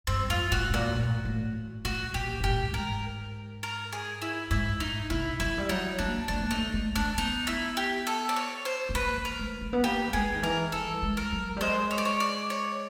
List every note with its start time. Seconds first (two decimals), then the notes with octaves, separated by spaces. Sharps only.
0.07 G2 C4
0.29 F2 F4
0.51 A2 F#4
0.70 A2
0.74 A#2 F#4
0.96 A2
1.25 A2
1.85 A2 F#4
2.14 A#2 G4
2.40 G#2
2.44 A2 G4
2.73 G#2 A#4
3.63 A#4
3.92 G#4
4.22 E4
4.51 G#2 E4
4.80 A2 D#4
5.10 C3 E4
5.40 F#3 E4
5.58 G3
5.69 F#3 D#4
5.99 A#3 D4
6.28 A#3 D4
6.40 A#3
6.51 A3 D#4
6.74 A3
6.95 A3 D4
7.17 B3 D#4
7.47 E4
7.77 G4
8.07 A4
8.29 D5
8.36 C#5
8.65 C5
8.89 B3
8.94 A#3 B4
9.17 A#3
9.25 A#4
9.39 A3
9.61 A3
9.73 B3
9.83 A#3 G4
10.07 G3
10.13 G#3 G#4
10.34 D#3
10.42 E3 A#4
10.72 G3 A4
11.02 G#3
11.17 A#4
11.32 F#3
11.56 G3
11.61 G#3 C5
11.91 C#5
11.98 D5
12.05 C#5
12.20 D5
12.50 C#5